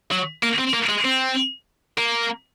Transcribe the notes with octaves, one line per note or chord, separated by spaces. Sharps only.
F#3
A#3
C4
A#3
G#3
C4
A#3